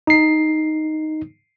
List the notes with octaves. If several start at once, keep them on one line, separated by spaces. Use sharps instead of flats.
D#4 C7